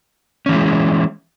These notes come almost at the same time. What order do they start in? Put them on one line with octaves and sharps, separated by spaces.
C#4 E3 E4 G#3